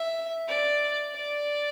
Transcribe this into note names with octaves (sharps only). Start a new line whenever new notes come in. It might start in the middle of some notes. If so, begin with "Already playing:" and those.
Already playing: E5
D5
D5